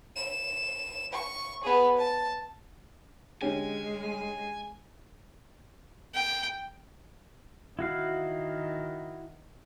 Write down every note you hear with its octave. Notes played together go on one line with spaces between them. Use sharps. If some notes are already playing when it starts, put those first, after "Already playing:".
E7
C#6
B3 G#4
A5
D3 G#3 C#4 G4 G#5
G5
D#3 E4 F#4 F5